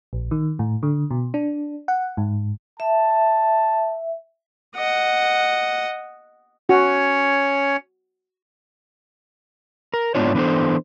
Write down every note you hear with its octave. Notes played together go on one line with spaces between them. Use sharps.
A#1
D#3
A2
D3
B2
D4
F#5
G#2
E5 A5
D#5 F#5
C#4 F#4 C#5
A#4
G#2 C#3 B3 D4 F4 C#5
E3 B3 D4 A4 C5